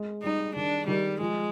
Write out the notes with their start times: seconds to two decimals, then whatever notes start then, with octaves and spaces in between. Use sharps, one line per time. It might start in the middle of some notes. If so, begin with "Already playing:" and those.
Already playing: G#3
0.23 G3 D#4
0.55 D#3 D4
0.87 D#3 G3
1.21 F3 G#3